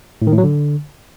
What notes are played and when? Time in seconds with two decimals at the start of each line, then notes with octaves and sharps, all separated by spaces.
0.22 A2
0.27 D#3
0.33 A2
0.38 F#3
0.44 D3